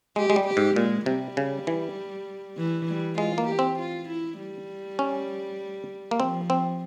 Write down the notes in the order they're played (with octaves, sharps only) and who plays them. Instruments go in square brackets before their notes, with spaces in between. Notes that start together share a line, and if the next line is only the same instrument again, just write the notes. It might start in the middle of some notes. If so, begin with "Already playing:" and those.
[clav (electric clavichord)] G#3 [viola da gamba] G4
[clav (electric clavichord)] G#3
G3
[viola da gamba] G4
[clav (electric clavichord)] G#2
[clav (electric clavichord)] A#2 [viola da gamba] G#3
[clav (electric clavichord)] C3 [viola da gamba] G3
[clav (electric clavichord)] C#3
E3
[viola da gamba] E3
G3
[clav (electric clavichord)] G#3 [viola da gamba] F4
[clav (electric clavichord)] A#3
[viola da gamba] G4
[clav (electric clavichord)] C4
[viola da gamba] F4
E4
G3
[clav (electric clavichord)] C#4
A#3
[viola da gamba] F3 [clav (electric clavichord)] C4
[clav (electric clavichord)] C4